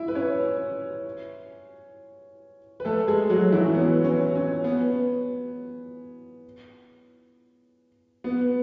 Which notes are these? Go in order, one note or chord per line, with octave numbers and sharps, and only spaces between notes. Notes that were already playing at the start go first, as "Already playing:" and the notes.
Already playing: E4 E5
B4
C#4 C#5
B4
A3 A4
G#3 G#4
F#3 F#4
E3 E4
C#4
B3
C#4
C#4
B3
B3